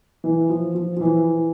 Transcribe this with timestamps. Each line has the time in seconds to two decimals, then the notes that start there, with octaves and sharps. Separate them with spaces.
0.24 E3
0.49 F3
0.75 F3
0.97 F3
1.01 E3